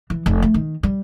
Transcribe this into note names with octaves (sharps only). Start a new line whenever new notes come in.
E3
F1
A3
D#3
G3